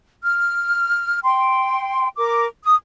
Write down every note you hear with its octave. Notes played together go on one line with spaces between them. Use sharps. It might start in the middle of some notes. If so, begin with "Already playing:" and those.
F6
G5 C6
A#4 D6
D#6